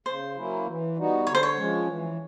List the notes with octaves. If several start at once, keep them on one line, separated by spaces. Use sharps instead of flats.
C#3 C5
F#3 A#3 C#4 E4
E3
G3 B3 D#4 F#4
D3 C#5
C5
C#5
F3 G#3 C#4
E3